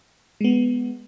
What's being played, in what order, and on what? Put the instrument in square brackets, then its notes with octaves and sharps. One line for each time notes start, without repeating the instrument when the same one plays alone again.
[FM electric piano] G#3 B3